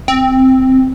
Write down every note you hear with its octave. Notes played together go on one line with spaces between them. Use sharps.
C4